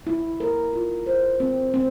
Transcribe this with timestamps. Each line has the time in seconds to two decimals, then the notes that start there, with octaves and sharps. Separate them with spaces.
0.07 E4
0.40 A#4
0.73 F4
1.06 C5
1.40 C4
1.74 C4